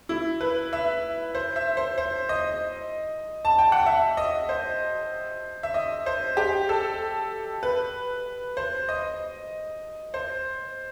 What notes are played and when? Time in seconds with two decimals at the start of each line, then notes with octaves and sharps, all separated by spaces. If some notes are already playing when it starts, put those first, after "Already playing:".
0.09 E4
0.41 B4
0.73 E5
1.35 C5
1.56 E5
1.77 C5
1.98 C5
2.29 D#5
3.45 A5
3.59 G5
3.72 F#5
3.86 E5
4.17 D#5
4.49 C5
5.63 E5
5.74 D#5
6.06 C5
6.37 G4
6.69 A4
7.63 B4
8.57 C5
8.89 D#5
10.14 C5